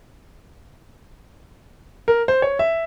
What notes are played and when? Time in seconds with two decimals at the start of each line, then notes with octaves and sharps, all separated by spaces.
2.08 A#4
2.28 C5
2.42 C#5
2.59 E5